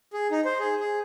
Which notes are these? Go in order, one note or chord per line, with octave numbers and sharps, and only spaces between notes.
G#4
D#4
C5
G#4
G#4